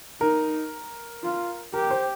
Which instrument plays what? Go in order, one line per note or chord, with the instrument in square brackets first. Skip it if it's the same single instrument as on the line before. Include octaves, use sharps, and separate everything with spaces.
[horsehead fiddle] D#4 [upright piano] A#4
[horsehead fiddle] F4
[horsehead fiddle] G4 [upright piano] A#4
[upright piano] C5